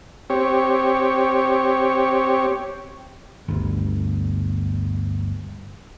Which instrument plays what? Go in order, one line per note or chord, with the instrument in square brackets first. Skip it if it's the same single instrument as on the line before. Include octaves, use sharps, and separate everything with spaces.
[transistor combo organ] C4 G4 C#5
[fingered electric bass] G1 D2